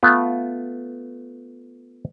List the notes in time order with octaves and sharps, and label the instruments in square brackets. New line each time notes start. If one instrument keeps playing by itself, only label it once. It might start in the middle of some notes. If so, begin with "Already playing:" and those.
[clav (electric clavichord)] A3 B3 F4